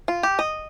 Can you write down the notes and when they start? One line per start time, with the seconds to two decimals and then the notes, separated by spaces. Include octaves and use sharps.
0.08 F4
0.23 G4
0.39 D#5